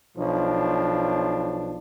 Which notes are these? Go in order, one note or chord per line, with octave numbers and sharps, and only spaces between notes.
B1 F3 D4